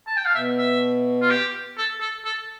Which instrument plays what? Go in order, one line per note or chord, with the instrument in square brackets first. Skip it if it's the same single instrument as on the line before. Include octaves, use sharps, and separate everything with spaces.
[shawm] A5
G5
F5
[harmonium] B2 [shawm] E5
[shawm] E5
F4
G4
A4
A4
A4